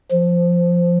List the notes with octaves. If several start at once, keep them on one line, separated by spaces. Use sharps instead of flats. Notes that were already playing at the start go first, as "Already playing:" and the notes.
F3